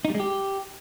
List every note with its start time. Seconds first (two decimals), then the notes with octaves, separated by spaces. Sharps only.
0.05 D#4
0.10 G3
0.15 G#3
0.20 G4